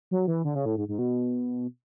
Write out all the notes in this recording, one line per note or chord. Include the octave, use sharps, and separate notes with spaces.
F#3
E3
D3
C#3
A2
G#2
G#2
B2